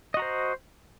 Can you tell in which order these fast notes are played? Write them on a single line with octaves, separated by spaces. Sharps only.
D#5 F#4 A#5 C5